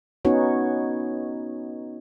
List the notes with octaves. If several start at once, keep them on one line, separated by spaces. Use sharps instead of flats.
B3 C#4 D#4 F#4 B4 C#5